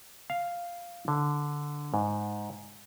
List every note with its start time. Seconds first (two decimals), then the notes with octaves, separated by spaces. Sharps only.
0.30 F5
1.08 D3
1.94 G#2